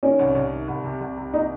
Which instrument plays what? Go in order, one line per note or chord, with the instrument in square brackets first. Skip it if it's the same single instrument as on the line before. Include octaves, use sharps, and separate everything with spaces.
[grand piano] D#3 [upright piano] C#4
[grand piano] C2
C2
D#3
C2
C3
C2
C3
[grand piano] D#3 [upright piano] D#4